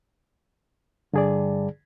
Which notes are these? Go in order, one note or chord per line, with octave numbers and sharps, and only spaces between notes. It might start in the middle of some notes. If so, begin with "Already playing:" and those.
G2 D3 G#4 D5